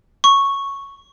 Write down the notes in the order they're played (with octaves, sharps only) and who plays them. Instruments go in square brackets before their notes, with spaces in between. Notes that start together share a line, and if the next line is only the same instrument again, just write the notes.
[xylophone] C#6